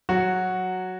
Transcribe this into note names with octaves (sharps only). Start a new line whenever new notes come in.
F#3 F#4